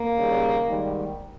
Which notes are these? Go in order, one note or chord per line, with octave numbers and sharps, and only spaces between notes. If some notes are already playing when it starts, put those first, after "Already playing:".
Already playing: A#3
D#2 C#3 G3
G#2 D#3 G3